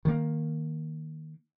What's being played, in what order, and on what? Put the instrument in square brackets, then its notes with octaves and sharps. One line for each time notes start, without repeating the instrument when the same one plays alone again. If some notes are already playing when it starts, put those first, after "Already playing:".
[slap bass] D#3 A#3